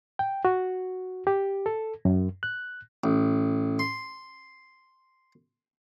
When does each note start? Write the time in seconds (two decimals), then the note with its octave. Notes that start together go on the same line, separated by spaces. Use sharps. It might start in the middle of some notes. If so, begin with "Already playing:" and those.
0.19 G5
0.45 F#4
1.27 G4
1.66 A4
2.05 F#2
2.43 F#6
3.04 A1
3.79 C6